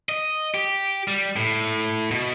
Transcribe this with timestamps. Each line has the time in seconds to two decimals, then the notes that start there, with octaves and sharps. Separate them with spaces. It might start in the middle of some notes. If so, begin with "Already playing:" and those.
0.09 D#5
0.54 G4
1.08 G3
1.36 A2
2.11 B2